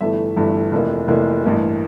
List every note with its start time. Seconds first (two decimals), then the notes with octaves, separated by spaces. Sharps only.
0.01 G1 G2 E3 A3 E5
0.36 G1 G2 E3 A3
0.72 F1 F2 E3 A#3
1.08 F1 F2 E3 A#3
1.44 A1 G2 E3 A#3